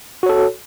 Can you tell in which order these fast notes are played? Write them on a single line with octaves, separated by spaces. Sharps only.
F#4 C#5 A4